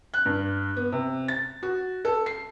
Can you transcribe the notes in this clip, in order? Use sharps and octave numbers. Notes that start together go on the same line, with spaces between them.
F#6
G2
B3
C3
A6
F#4
A4
C7